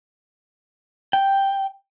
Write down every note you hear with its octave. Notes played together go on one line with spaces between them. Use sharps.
G5